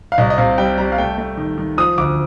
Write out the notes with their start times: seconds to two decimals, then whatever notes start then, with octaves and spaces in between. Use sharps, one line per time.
0.12 F5
0.18 C2 D#5
0.30 D#5
0.38 C3 F5
0.58 G3 G5
0.78 G3 A#5
0.92 F5
0.98 A3 G5
1.18 A3
1.37 D#3
1.58 D#3
1.77 F3 D#6
1.98 D2 D6